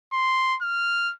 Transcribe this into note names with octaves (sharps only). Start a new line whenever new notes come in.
C6
F6